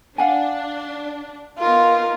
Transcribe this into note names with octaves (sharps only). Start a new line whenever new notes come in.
D4 F5 F#5 G#5
B3 D#4 F4 A#4